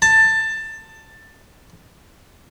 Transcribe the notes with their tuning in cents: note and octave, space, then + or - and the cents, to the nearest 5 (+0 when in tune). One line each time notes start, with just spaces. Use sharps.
A5 +15